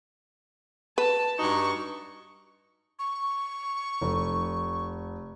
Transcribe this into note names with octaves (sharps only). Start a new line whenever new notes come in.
B4 A5
G2 D#4 F#4 C#6
C#6
F1